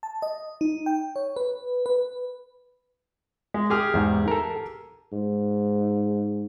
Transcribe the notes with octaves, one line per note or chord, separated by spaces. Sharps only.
A5
D#5
D#4
G5
C#5
B4
B4
G#3
G4 G#4 F6
E2 G#2
A4 A#4
G#2